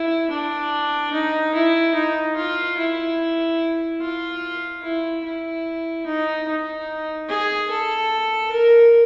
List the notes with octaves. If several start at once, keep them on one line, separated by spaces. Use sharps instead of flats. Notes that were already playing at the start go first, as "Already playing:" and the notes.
Already playing: E4
D4
D#4
E4
D#4
F4
E4
F4
E4
E4
D#4
D#4
G#4
A4
A#4